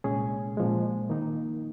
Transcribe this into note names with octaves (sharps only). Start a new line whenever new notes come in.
C2 A#2 G#3 C#4 G#4
A#2 F3 G#3
D#3 A#3 D#4